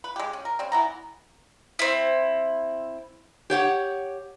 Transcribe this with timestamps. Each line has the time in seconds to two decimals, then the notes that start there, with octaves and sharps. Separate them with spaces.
0.04 B4
0.16 G#3 G4
0.33 C#4
0.45 A#4
0.59 G3 C4 C#4
0.72 E3 B3 A#5
1.79 C4 E4
3.50 G4 C#5 F#5